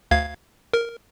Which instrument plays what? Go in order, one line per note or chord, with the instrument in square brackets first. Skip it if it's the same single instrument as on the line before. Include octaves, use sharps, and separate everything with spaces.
[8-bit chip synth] D2 F5 G#6
A#4